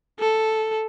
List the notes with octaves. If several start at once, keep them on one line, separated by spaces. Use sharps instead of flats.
A4